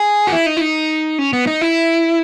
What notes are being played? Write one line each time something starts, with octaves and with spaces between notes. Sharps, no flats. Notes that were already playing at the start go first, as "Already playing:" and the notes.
Already playing: G#4
F#4
E4
D#4
E4
D#4
C#4
B3
D#4
E4